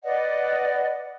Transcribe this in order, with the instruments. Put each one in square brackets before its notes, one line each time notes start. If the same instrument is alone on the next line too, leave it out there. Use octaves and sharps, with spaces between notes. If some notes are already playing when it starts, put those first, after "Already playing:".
[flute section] B4 D5 D#5 F#5